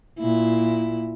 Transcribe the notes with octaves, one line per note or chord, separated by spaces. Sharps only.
A#2 E4